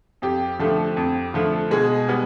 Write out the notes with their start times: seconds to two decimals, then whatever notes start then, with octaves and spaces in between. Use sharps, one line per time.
0.22 F2 G4
0.59 D3 F3 A3
0.97 F2
1.34 D3 F3 A3
1.71 B2 G#3 G#4
2.09 G3 B3